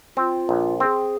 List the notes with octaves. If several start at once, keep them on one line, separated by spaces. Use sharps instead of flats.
C4 F4
A#1
C4 G#4